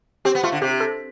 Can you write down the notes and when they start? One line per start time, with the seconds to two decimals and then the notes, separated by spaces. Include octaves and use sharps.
0.25 C4 G4
0.35 B3
0.43 A3 F4
0.52 D3
0.62 C3 G4
0.80 A4